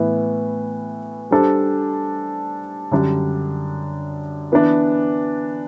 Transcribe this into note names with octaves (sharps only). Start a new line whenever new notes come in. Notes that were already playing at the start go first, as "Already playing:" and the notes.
Already playing: A2 E3 B3
G3 D4 A4 C5
F#2 D3 G3 D4
E3 B3 D4